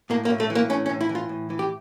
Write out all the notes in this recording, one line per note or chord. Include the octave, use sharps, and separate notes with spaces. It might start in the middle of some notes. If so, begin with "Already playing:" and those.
A2 A#3
A#3
A2
A3
E3
A#3
A2 C#4
C#4
A2
E4
E3
F4
A2
E3
G4